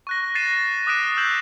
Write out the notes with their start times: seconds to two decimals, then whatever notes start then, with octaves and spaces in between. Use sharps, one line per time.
0.07 C#6 F#6 A#6
0.35 A6 C7 D#7 E7
0.87 D6 D#6 F#6 B6 D7 E7
1.03 G7
1.17 E6 G6 E7 F#7